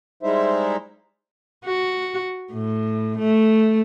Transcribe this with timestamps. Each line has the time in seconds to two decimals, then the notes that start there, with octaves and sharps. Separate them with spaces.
0.23 G3 G#3 D#4 E4 C5 E5
1.65 F#4
2.53 A2
3.19 A3